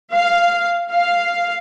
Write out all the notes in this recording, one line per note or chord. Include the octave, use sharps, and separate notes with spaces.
F5
F5